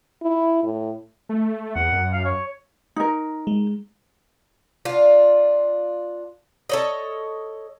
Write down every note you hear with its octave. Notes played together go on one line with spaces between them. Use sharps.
E4
A2
A3
E2 F#5
F#2
F5
C#5
D#4 A#4
G#3
D4 F4
A4 C#5 D#5